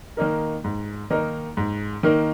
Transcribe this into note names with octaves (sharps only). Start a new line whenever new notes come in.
D#3 A#3 D#4 A#4
G#2
D#3 A#3 D#4 A#4
G#2
D#3 A#3 D#4 A#4